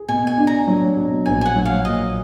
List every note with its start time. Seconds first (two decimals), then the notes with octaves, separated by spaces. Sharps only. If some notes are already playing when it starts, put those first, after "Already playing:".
Already playing: G#4
0.08 B2 G#5
0.27 G#5
0.38 D4
0.47 A#5
0.68 F#3
0.96 B2
1.26 A#1 G#5
1.41 G#5
1.46 F#5
1.56 F#3
1.65 F5
1.85 A#2 D#5